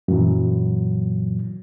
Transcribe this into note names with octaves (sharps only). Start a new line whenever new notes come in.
F#2 A#2 E3 F#3